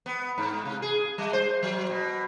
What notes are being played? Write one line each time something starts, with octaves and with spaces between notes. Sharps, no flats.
B3
G#2
C3
G#4
G3
C5
F#3
B2